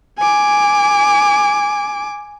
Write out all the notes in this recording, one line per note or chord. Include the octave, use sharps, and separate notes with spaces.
G#5 D6